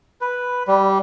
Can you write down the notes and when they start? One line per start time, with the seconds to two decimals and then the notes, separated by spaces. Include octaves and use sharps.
0.21 B4
0.68 G3